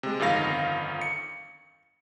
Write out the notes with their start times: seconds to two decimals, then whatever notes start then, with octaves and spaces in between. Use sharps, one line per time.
0.03 C3 G#3
0.19 G1 F2 D#3 F5 A#6
1.01 C#7